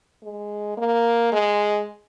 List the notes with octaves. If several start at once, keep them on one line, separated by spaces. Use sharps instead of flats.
G#3
A#3
G#3